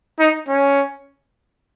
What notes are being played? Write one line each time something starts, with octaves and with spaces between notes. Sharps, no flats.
D#4
C#4